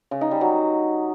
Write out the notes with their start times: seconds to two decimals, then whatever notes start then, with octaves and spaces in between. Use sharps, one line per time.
0.11 C#3
0.21 D#4
0.31 G3
0.41 F#3